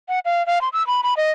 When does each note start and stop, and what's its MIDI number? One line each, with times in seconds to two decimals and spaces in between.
0.09 0.19 78
0.25 0.46 77
0.47 0.61 77
0.61 0.69 84
0.73 0.85 88
0.87 1.01 83
1.03 1.14 83
1.17 1.31 75